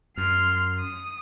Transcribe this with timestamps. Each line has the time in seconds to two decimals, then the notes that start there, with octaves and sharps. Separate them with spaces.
0.17 F#2 C6 F6
0.80 D#6